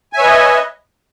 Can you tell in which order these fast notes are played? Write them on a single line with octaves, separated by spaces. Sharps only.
G#5 E5 C#5 B4 D#5